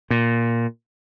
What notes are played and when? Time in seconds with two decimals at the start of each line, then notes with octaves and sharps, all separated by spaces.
0.11 A#2